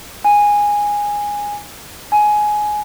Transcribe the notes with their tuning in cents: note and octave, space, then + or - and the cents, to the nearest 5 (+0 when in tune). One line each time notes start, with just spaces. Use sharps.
G#5 -10
G#5 +15